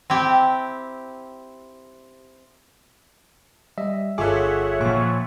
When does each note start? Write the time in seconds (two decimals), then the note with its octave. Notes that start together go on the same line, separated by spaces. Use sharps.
0.10 C4 E4 G4
3.78 G3 D#5 E5
4.18 G1 F4 G#4 A4 C#5 E5 F#5 D6
4.81 A#2 F3 C#6